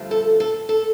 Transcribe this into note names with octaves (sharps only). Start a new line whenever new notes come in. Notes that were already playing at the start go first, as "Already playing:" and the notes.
Already playing: G2 D3 F3 A3
A4
A4
A4